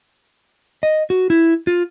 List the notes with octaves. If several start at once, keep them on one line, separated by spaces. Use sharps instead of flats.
D#5
F#4
E4
F4